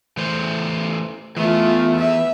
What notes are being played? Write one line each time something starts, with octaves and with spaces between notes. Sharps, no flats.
E3 A3 C5
E3 A3 B3 F4
E5